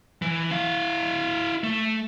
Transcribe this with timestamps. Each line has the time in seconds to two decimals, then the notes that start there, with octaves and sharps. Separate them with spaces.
0.22 E3
0.51 E4 F5
1.64 A3